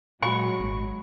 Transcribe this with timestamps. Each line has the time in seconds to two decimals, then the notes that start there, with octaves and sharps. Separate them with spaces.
0.22 A#2 F#3 G#3 F#4 B5 C#6
0.60 G#1